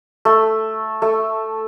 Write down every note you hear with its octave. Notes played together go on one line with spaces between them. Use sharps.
A3
A3